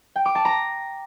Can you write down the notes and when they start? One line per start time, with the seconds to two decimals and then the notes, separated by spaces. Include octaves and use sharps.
0.16 G5
0.25 D6
0.35 A5
0.45 A#5